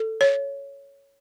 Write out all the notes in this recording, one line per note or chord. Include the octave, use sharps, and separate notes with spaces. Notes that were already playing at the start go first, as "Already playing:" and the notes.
Already playing: A4
C#5